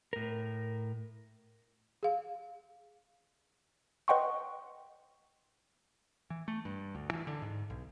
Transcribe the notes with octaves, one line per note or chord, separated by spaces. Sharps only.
A2 A#4
G#4 F5
B4 D#5 F#5 G5 C6 C#6
E3
A3
G2
D2
E3
D3
G#2
B1